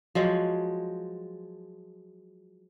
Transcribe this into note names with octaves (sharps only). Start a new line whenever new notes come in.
F3 F#3 G#3